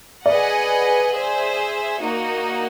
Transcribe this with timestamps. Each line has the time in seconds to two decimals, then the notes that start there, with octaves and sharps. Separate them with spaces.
0.25 G#4 B4 D5 D#5 F#5
1.12 G#4 C5 E5
2.00 A#3 D#4 F#4